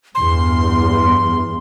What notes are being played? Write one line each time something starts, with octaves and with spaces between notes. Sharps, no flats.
E2 G2 C6